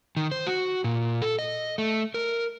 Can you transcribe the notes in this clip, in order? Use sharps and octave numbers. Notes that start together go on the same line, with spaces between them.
D#3
C5
F#4
A#2
A4
D#5
A3
A#4